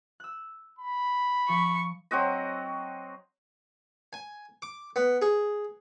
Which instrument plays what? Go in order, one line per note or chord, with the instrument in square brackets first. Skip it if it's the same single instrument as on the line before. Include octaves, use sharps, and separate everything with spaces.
[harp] E6 F#6
[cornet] B5
[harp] F3 [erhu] C#6
[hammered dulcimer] F#3 C4 F#4 D#5
[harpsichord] G#5
D6
B3
G#4